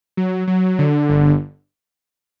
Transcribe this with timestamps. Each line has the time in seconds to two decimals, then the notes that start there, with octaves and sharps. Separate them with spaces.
0.17 F#3
0.47 F#3
0.79 D3
1.09 G1